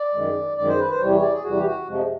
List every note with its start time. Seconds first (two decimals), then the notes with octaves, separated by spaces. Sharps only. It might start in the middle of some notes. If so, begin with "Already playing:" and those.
Already playing: D5
0.14 F#2 D#3 G#3
0.57 F#2 D#3 G#3 D5
0.68 C5
0.79 B4
0.90 C5
1.00 E2 C3 E3 G3 C#5
1.11 C#5
1.22 D5
1.33 G#4
1.43 E2 C3 E3 G3 F#4
1.58 G4
1.65 F#4
1.87 F2 C3 F3 G#3